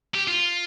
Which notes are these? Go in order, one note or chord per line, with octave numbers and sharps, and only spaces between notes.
G4
F4